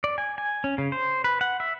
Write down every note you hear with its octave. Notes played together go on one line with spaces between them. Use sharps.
D5
G#5
G#5
C#4
C#3
C5
B4
F#5
E5